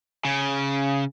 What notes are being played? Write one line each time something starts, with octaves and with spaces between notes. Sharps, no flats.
C#3